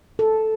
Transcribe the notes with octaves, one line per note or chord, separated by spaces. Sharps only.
A4